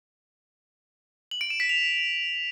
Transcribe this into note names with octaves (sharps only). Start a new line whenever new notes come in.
F#7
D7
E7
B6
F7